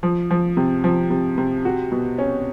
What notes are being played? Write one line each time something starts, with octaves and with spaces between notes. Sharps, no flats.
F3
F3
C3
F3
C3
C3
F#4
B2
C#4